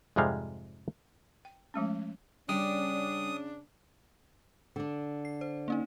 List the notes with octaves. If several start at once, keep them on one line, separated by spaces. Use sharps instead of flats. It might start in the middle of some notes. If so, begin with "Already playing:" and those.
F2 G#2 C3 G3 G#3 F5
G5
F3 G#3 A3 C#4
C#3 G3 C#4 D4 D#6
D3 D4
C7
C5
A#3 C#4 D#4